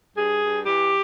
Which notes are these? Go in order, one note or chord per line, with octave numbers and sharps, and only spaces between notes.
G2 G#4
G2
E3 G4